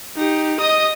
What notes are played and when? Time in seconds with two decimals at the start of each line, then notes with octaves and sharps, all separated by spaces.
0.16 D#4 G4
0.60 D#5 D#6